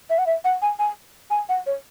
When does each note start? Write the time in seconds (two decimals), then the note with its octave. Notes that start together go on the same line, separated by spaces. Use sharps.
0.10 E5
0.18 F#5
0.26 E5
0.44 F#5
0.62 G#5
0.79 G#5
1.30 G#5
1.49 F#5
1.66 C#5